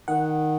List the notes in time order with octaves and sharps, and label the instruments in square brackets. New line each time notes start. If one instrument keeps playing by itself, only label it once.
[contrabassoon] D#3 [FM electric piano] F#5